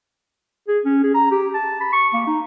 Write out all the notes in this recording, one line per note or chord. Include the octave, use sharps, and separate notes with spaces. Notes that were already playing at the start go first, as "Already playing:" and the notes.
G#4
C#4
G#4
A#5
G4
A5
B5
C#6
A#3
D#4